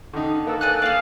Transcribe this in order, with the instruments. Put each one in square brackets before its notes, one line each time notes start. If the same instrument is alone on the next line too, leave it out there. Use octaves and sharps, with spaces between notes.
[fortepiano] D3 D#3 D#4
[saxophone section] A#3 A4 B4
[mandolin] D5 G#5 F#6
[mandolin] D4 G#4 [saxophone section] F5